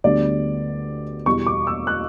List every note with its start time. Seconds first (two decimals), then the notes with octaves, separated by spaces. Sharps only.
0.04 D2 D3 G3 B3 D5
1.26 E2 B2 G3 C#6
1.47 D6
1.67 E6
1.87 F#6